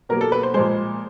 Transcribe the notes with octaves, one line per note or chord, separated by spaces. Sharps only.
B2 F#3 A#3 A#4
A4
B4
C5
A#2 F3 G#3 C5